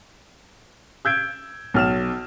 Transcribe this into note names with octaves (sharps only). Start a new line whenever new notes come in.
E6 G6 G#6 D7
B1 F6 E7